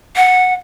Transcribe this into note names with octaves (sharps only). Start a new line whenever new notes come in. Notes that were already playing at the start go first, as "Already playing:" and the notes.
F#5